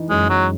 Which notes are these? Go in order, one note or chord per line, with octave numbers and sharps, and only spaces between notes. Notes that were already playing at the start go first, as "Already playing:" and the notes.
Already playing: E3 D#4
F#2 G#3
F#3 G#3